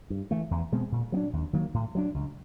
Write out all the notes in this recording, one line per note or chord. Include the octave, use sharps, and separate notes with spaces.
G2
E3 A3
E2
B2 G#3 C4
A#2
F#3 B3 D4
D#2
D#3 F#3 A#3
A2
F#3 A#3 D4
C#2